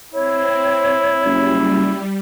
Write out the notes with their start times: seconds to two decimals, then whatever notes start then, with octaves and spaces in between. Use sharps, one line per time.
0.14 C4 E4 C#5
1.26 F#1 G3